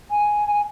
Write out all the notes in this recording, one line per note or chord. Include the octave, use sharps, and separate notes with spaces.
G#5